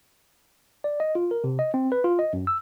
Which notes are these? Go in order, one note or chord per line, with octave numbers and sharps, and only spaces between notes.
D5
D#5
F4
A#4
C3
D#5
C4
B4
F4
D#5
F#2
E6